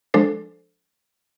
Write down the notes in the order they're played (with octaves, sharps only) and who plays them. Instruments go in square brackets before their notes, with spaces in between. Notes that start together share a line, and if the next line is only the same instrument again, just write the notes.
[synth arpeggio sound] F3 G#3 D4 A4 C5